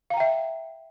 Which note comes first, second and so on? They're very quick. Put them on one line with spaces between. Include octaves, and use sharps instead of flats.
F5 A#5 G5 E5